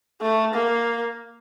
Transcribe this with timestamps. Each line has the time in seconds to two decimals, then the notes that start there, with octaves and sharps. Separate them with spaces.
0.21 A3
0.54 A#3